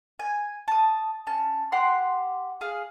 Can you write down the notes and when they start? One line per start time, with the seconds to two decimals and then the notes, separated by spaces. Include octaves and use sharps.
0.19 G#5
0.68 A5 D#6
1.27 C#4 A5
1.72 G4 F#5 C6
2.61 G#4 F5